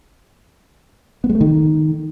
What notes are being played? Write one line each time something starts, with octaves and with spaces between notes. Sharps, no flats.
B3
G#3
A3
D#3